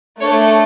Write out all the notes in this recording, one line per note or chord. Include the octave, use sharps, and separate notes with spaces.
A3 D4 A4 C#5